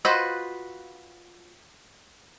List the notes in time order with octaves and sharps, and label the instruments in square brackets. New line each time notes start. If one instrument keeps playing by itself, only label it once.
[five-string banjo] F4 F#4 B4 C5 D#5